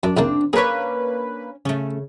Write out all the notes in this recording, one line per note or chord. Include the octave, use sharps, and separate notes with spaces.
F#2 D4
C2 C#3 A#3 C4 D4
A#3 C#4 D4 G#4 B4 C#5
C#3 A3 C#4